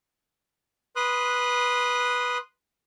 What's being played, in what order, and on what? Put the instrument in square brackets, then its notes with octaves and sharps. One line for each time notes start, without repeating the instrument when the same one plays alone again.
[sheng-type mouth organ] B4 C6 D#6 F#6